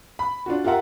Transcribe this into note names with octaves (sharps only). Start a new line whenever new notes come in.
B5
D4 F4 F#4
F4 G4 A#4 E5 F#5 A#5